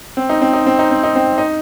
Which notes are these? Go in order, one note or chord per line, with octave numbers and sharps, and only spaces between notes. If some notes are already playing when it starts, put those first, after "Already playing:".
C4
D#4
C4
D#4
C4
D#4
C4
D#4
C4
D#4